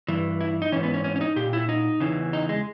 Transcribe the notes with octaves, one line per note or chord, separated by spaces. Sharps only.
G2 E3
E4
D#4
G#2 E3 C#4
B3
C#4
C#4
C#4
D#4
A#2 G4
E4
D#4
E2 C#3 E3
D#4
G#3